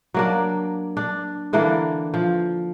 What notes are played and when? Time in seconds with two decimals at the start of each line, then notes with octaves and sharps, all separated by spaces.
0.14 F#3 A#3 D4
0.97 D4
1.53 D3 E3 A#3 D4
2.14 F3